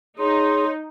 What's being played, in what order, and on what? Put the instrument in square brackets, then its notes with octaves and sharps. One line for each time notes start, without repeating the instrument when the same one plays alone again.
[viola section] D#4 [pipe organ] G#4 [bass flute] C#5 [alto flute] C6